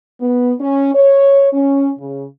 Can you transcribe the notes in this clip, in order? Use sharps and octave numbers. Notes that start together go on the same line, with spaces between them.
B3
C#4
C#5
C#4
C#3